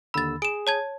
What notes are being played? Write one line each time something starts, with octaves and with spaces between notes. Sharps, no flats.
D#2 D3 B5 E6 A6
G#4 D7 E7
C#5 A5 G#6